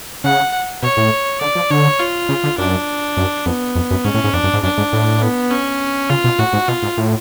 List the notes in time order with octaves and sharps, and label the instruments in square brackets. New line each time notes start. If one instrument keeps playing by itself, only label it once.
[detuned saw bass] C#3 [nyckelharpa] F#5
[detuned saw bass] B2 [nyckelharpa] C#5
[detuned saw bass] A2
[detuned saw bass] D3 [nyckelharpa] D5
[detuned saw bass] F3
[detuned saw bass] D3 [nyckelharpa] C#5
[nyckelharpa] F4
[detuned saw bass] C#3
D3
[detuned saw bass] F#2 [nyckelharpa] D4
[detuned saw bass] F#2
[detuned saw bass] F2 [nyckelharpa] B3
[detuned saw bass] F2
F#2
[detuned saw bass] G#2 [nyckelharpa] C#4
[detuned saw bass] A2
G#2
[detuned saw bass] F2 [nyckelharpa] D4
[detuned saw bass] F#2
G#2
[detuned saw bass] F#2 [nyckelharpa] D4
[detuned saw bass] G#2
A2
[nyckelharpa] B3
C#4
[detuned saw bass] C#3 [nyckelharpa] F4
[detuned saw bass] B2
[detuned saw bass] A2 [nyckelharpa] F#4
[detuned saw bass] G#2
[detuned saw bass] B2 [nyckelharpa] F4
[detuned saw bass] G#2
A2